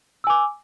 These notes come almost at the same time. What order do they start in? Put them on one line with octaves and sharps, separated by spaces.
E6 G#5 D6